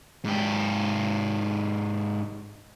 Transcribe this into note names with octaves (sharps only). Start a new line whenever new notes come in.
G#2 G4